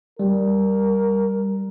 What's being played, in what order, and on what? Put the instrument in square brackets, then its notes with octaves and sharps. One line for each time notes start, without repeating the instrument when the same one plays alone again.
[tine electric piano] G3 [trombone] A#4